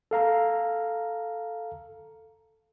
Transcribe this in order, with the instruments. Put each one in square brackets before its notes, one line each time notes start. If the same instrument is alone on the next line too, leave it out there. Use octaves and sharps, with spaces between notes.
[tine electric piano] A4 F5 A#5